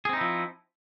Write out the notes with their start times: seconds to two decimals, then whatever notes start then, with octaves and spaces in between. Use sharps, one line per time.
0.05 G#4
0.09 C4
0.13 D#4
0.17 E4
0.21 F3